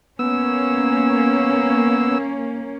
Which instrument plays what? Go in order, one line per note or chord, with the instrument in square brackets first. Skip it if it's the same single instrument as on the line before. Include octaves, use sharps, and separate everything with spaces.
[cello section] A#3 C#4 [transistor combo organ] B3 E6